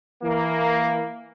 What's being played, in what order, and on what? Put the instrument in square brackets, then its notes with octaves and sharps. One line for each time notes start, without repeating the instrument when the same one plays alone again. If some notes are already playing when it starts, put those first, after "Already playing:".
[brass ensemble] E3 A#3